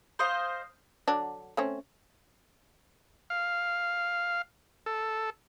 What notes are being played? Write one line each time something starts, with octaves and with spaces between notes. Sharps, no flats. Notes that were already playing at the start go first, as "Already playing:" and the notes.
C5 D#5 F5
D3 F#3 D4
A3 C4 C#4
F5
A4